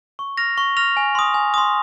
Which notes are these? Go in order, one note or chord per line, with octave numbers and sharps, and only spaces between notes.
C#6
F6 A#6 F7
C#6
F6 A#6 F7
G#5
C6 D#6
G#5
C6 D#6